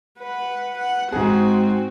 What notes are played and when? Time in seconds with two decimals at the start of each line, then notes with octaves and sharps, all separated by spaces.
0.19 B4 F#5
0.78 F#5
1.12 G#2 C4 F#4 G#4